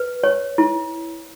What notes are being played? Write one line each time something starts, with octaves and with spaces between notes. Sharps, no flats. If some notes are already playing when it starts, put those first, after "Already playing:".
Already playing: B4
C#5
E4